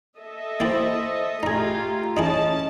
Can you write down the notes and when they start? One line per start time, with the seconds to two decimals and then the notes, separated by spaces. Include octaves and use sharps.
0.18 A4 D#5 E5
0.60 A#3 E4 G4 C5 A6
1.43 A3 D#4 F4 G4 G#4 A#5 G#6
2.17 E3 C#4 D#4 E4 G#4 D#5 A5